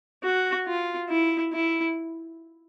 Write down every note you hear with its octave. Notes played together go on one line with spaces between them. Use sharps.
F#4
F4
E4
E4